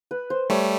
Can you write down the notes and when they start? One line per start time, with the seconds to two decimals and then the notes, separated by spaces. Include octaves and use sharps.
0.11 B4
0.30 C5
0.50 G3 A3 C#5